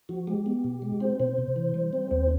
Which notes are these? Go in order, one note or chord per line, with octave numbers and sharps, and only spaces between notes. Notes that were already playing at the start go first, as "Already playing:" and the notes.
F3 F#4
G#3 G4
B3
B2
G#3
C4 C5
B2 C5
C3
E3
G3
C4
D#2 C5